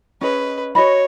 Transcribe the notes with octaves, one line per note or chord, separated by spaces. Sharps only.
C#4 G#4 B4 D#5
F#4 C#5 D#5 B5